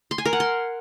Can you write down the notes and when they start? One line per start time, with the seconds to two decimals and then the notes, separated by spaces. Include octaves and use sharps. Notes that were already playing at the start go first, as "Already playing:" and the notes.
0.11 C6
0.18 G#5
0.25 A#4
0.33 F#5
0.40 C6